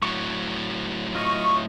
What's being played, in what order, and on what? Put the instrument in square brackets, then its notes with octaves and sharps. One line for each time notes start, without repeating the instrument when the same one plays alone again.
[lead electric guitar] A2 F#3 [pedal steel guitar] C#6
[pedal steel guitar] F4 D#5 [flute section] C#6